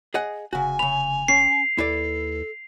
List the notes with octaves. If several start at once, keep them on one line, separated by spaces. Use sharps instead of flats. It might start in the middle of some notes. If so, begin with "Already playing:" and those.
G#4 D#5 F#5
F1 C#3 F#4 G#5
C#3 B5 F7
C#4 C7
D#2 E4 A4 B4 D5